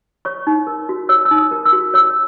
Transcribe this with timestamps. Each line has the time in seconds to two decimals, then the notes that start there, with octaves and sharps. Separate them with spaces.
0.25 C#5 C#6
0.47 D#4
0.67 A#4
0.89 F#4
1.09 C#5 E6
1.25 E6
1.31 D#4
1.38 D#6
1.51 A#4
1.65 E6
1.72 F#4
1.94 C#5 E6